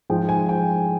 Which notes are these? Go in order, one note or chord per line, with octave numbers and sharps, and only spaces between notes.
G#2 F3 G#3 G5
G#5
G5